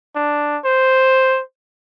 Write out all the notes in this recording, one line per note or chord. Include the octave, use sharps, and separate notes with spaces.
D4
C5